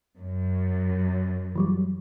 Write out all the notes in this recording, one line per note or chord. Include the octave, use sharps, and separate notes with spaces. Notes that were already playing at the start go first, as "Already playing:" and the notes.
F#2
E3 F#3 G3